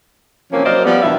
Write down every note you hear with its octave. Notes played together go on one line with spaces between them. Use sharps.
C3 E3 F3 A#3 C#4
F#3 A#3 A#4 C5 D5 D#5
F3 G3 B3
G2 B2 D#3 E3 B3 E5